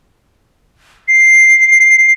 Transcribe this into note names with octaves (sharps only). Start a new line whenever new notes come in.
C7